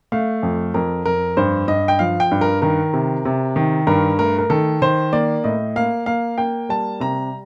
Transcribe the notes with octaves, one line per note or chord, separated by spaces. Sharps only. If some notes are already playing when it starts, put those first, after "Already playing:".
A3 F5
F2
F2 A#4
F2 A#4
G2 C5
G2 D#5
G5
F3 F5
G5
G2
A#4
D#3 A#4
C3
C3
D#3
G2 A#4
A3 A#4
A#4
D#3 A4
D#3 C5
A#3 D5
A2 D#5
A#3 F5
A#3 F5
A#3 G5
G3 A5
C3 A#5